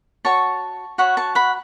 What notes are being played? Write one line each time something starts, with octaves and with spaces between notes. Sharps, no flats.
F#4 C#5 A5 C#6
F#4 C#5 F#5 B5
A5 C#6
F#5 B5